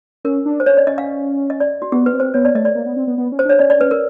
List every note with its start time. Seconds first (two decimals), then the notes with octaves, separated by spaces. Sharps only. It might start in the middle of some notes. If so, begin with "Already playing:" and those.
0.25 C#4 A#4
0.46 D4
0.60 C5
0.66 C#4 C#5
0.77 D5
0.87 C#4 D#5
0.98 F5
1.50 D#5
1.60 D5
1.82 F#4
1.92 B3 G4
2.06 B4
2.13 C4
2.20 C5
2.34 B3 C#5
2.45 D5
2.55 A3 D#5
2.65 D5
2.75 A#3
2.86 B3
2.96 C4
3.07 B3
3.18 B3
3.32 C#4
3.39 C5
3.45 D4 C#5
3.59 C#4 D5
3.70 D5
3.81 B4
3.91 A#4